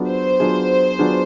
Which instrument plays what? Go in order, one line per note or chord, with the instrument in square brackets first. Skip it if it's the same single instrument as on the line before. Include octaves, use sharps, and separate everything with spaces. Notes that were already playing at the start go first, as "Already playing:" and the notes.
Already playing: [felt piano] F#3 B3 D4 F4 G#4
[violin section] C5
[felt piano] F#3 B3 D4 F4 G#4
F#3 B3 D4 F4 G#4